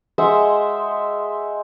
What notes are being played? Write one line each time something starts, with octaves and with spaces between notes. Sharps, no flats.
G#3 C5 E5 F#5